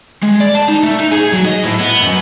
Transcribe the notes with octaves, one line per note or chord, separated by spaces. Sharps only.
G#3
D5
A5
D#4
A3
D#4
G#4
F#3
D#5
A2
B3
F#2